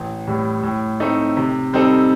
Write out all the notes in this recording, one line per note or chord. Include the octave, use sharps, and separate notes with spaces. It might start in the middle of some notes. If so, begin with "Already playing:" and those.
Already playing: A1
A2 G3
A2
A3 C4 D#4
C3
G3 C4 D#4 A4